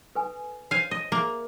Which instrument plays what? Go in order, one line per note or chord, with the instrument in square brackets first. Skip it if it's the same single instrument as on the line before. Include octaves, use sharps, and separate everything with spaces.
[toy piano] A4 B4 G#5
[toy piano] C5 C#5 [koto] F5 G#5
[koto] D#5
[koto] A#3 [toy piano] G#4 E5